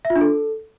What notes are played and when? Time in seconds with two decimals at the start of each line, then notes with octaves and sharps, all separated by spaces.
0.05 E5
0.10 F4
0.16 D4
0.21 A4